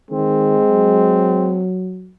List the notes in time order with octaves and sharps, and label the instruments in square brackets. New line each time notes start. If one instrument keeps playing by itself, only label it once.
[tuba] D#3 [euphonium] G#3 [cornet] C4
[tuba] F#3